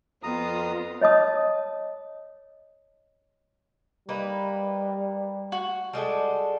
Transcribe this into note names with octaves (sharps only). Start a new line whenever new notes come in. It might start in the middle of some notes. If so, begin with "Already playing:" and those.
F2 B3 F4 A#5 D#6
C#5 D#5 A5 D#6
G3 A#3 D#4 B4
F#4
G3 G#3 A4